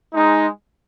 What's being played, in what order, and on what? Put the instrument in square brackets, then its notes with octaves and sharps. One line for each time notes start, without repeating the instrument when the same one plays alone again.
[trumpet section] G#3 D#4